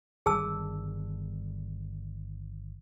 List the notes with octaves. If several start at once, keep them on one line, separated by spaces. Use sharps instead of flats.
G1 D#3 G3 G#4 A5 E6